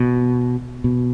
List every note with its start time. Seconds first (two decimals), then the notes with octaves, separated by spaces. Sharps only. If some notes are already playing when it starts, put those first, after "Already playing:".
Already playing: B2
0.84 B2